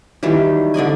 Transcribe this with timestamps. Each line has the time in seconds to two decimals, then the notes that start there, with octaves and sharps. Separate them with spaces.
0.23 D#3 E3 F#3 G3
0.74 D3 D5 D#5 G#5